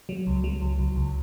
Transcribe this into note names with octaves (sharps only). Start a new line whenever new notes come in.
F#3
C#2
F#3
C#2
C#2
C#2